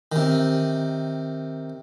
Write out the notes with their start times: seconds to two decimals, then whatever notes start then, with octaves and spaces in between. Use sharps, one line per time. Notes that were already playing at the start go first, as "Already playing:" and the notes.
0.12 C3 D#3